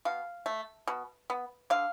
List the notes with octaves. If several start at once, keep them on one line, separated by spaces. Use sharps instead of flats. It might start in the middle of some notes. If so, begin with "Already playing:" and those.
B2 F5
A3
B2
B3
D3 F5